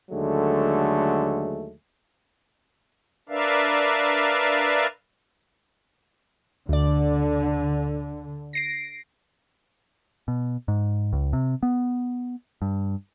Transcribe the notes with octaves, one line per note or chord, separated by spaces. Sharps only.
D#2 D3 F#3 G#3 A3
D4 A#4 B4 D5 E5 F5
D2 D3 D5
A#6 C7 D7
B2
G#2
C#2
C3
B3
G2